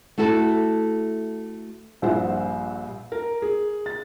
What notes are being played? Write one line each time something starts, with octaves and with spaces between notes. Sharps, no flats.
A3 E4 F#4 A4
A#1 G2 A#2 C5 E5 F#5
A#4
G#4
A6